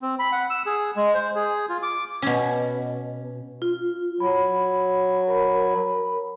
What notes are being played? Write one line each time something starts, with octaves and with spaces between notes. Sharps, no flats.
C4
B5
F#5
E6
G#4
G#3
C5
G#4
F4
D6
B2 C#4
F4
F#3 B5
A#4 B5